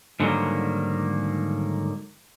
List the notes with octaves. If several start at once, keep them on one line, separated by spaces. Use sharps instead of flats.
G#2 D3 D#3 F#3 G3 A#3